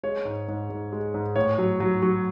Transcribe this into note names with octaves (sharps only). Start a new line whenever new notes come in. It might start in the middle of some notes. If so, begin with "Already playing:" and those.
G#3 C#5
G#2
G#2
G#2
G#3
G#2
A2 C#5
F#3
F#3
F#3